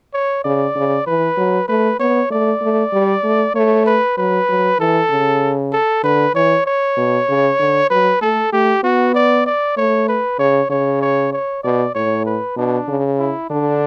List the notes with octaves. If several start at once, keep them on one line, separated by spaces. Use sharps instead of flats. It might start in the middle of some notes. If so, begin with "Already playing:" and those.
C#5
C#3 D5
C#3
E3 B4
F#3
A3 B4
B3 C#5
A3 D5
A3
G3
A3
A3 C#5
B4
F#3 B4
F#3
E3 A4
C#3
A4
D3 B4
E3 C#5
C#5
B2
C#3
D3
F#3 B4
A3 A4
A3 G4
B3 F#4
D5
D5
A3 C#5
B4
C#3 C#5
C#3 C#5
C#5
C#5
B2 D5
A2 C#5
B4
B2 D4
C#3
E4
D3 D4